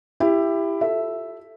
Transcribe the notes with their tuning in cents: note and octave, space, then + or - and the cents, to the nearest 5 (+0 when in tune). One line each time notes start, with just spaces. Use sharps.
E4 +15 G4 +15
F4 +35 A4 +0 E5 +0